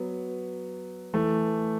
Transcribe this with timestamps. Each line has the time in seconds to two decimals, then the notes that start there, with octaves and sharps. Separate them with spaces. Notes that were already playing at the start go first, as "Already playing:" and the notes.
Already playing: F#3 B3
1.14 E3 A3